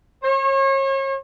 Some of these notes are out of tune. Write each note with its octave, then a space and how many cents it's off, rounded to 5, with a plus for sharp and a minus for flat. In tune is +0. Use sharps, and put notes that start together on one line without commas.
C#5 -40